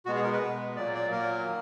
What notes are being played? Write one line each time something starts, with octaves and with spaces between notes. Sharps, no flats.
B2 G#3 B3 F#4
G#4
A#4
B4
B2 G#3 B3
A#2 F#3 A#3 D5
D5
A#2 F#3 A#3 A#4
D#3